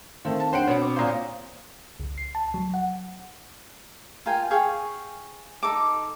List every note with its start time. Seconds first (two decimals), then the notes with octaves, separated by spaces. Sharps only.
0.25 D#3 A3 C4 F5
0.40 A5
0.53 D4 C5 F#5 G5 D7
0.68 B2 C4 C#5 F#5
0.82 D6
0.96 A#2 C5 F5 A#5 D#6
2.00 C#2
2.18 C7
2.35 A5
2.54 F#3
2.74 F#5
4.26 F4 A#4 G5 G#5
4.51 G#4 F5 G5 C#6
5.63 D#4 A4 D6